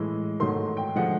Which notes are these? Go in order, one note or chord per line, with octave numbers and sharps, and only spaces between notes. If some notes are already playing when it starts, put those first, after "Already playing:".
Already playing: A2 E3 G#3
G#2 D#3 F#3 A3 C6
G5
D3 F3 G#3 F#5